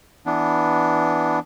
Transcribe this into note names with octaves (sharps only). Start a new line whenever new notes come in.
E3 B3 D4